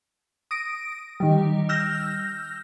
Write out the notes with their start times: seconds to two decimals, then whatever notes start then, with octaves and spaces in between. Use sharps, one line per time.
0.51 D#6 A#6 D7
1.20 D#3 G3
1.69 E6 F6 G6 A#6